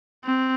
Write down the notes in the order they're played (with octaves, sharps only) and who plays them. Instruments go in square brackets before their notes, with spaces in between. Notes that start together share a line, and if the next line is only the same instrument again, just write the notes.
[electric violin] C4